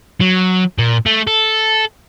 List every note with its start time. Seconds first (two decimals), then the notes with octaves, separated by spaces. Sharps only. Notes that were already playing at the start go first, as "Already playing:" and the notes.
0.21 F#3
0.79 A#2
1.06 A3
1.27 A4